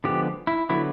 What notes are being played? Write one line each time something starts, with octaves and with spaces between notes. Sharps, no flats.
D3 F3 G#3 B3 G4
E4
D3 F#3 B3 E4